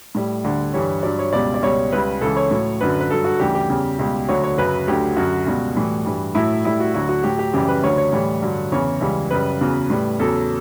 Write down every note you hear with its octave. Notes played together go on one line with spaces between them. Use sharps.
A2 G3
D2 D3 G3
G2 E3 G3 C#5
G2 F#3 D5
C#5
C#2 B2 G3 D5
D5
C#2 B2 G3 C#5
C#2 C#3 G3 B4
C#2 C#3 E3 A4
C#5
A2 F#3
F#2 D3 F#3 B4
B4
G2 F#3 A4
F#4
D2 C#3 E3 G3 G4
G4
E2 C#3 G3
C#2 B2 G3
D2 D3 F#3 C#5
C#5
F#2 C#3 F#3 B4
D2 D3 F#3 G4
F#2 D3 F#3 F#4
C#2 B2 G3
A2 E3 G3
G2 E3 G3
A2 F#3 E4
A2 G3 E4
F#4
D2 D3 F#3 F#4
F#4
A2 F#3 G4
G4
F#2 C#3 E3 G3 G4
B4
D2 D3 F#3 C#5
C#5
A2 E3 G3
G2 D3 F#3
E2 C#3 E3 C#5
C#2 C#3 E3 G3
F#2 C#3 G3 B4
E2 C#3 F#3
A2 G3
E2 C#3 F#3 A4